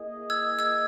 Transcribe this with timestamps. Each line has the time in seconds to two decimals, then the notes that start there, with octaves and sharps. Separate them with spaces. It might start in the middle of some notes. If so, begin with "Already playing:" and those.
Already playing: A#3 E4 G#4 D#5
0.30 E6 G#6
0.59 E6 G#6